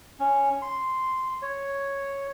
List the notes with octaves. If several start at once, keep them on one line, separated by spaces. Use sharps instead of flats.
C#4
C6
C#5